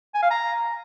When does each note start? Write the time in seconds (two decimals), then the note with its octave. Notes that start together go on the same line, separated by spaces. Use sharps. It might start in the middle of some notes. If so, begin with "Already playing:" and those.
0.15 G#5
0.23 F5
0.31 A#5